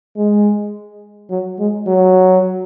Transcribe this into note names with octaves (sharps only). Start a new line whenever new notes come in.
G#3
F#3
G#3
F#3